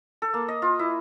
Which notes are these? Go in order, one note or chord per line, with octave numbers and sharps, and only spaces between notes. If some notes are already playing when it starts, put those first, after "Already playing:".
A4
A#3
D#5
F4
E4